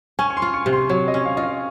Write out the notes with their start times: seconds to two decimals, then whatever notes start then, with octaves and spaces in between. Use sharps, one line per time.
0.19 C#4 G#5
0.30 C#6
0.37 C6
0.42 F4
0.54 C#6
0.66 C3
0.73 C6
0.89 F#3 C#5
1.08 D#5
1.14 C#4
1.25 F5
1.37 F4 D#5
1.43 F5